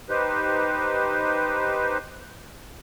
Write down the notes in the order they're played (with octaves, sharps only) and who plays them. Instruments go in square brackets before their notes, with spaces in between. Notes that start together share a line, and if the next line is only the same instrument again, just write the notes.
[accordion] D#4 G4 B4 C5